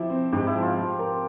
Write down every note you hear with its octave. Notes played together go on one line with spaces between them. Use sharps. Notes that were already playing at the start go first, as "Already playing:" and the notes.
Already playing: F3 E4 G4
C4
G#2 G4
E4
F3
F4
F3
A#4